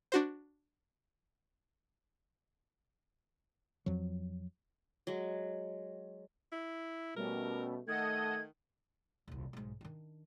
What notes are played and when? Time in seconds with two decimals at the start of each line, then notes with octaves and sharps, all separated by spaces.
0.12 D4 F#4 C5
3.86 F2 F3 F#3
5.07 F#3 G#3
6.52 E4
7.16 B2 G3 A3 C#4 A#4
7.88 D#3 A3 A4 D#5 F#5 G#6
9.28 D#1 C2
9.53 B1 G#2
9.81 D#3 D4